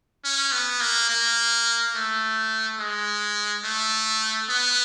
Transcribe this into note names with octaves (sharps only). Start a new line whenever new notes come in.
C#4
B3
A#3
A#3
A3
G#3
A3
B3